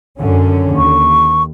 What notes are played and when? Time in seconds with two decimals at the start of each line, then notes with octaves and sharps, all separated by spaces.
0.20 F#2 D3 C#4
0.77 D#2 C#6